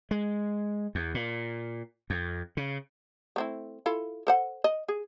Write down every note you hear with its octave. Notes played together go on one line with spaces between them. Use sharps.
G#3
E2
A#2
F2
C#3
A3 C4 E4
E4 F4 A4
A4 C5 F#5
D#5
G#4